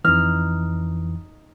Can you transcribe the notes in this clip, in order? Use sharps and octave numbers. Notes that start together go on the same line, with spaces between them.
F2 E3 D#4 F6